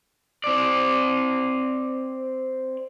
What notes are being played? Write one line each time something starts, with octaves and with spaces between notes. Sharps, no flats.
C4 D5